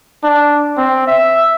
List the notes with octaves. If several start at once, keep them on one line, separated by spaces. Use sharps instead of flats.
D4
C4
E5